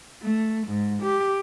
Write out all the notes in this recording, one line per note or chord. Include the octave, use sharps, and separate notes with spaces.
A3
G#2
G4